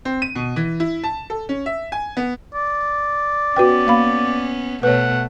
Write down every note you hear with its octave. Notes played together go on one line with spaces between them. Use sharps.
C4
D#7
B2
E3
E4
A5
A4
C#4
E5
G#5
B3
D5
B3 C#4 F#4 B4 G5
A#3 F5 B5
B2 A3 B4 C#5 F#5